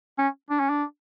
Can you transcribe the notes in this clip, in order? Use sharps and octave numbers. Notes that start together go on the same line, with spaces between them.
C#4
D4
C#4
D4